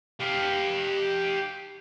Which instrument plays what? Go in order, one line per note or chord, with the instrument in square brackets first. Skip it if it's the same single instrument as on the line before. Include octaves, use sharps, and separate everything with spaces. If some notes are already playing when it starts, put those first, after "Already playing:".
[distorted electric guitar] G4 F5